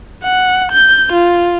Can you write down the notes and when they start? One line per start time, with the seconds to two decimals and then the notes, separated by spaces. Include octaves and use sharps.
0.24 F#5
0.72 G6
1.13 F4